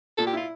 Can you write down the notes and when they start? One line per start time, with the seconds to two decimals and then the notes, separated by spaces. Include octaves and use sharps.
0.17 A#2 A4
0.27 G4
0.33 E4 F4